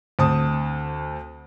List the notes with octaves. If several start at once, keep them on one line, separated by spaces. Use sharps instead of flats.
D2 C4 A5 D#6